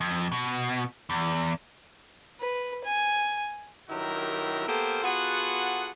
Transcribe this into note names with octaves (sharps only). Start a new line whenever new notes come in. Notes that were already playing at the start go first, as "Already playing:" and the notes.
F2
B2
E2
B4
G#5
G2 D#3 F#3 E4 G4 A#4
A#3 B3 G4 A4 A#4 C5
B3 F4 F#4 G#4 A4 F#5